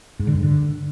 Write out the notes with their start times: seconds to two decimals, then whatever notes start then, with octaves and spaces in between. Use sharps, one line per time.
0.19 G#2
0.27 D3
0.35 G2
0.43 D3